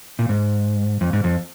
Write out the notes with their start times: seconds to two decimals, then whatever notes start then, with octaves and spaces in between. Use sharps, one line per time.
0.19 A#2
0.29 G#2
1.01 F2
1.13 G#2
1.24 F2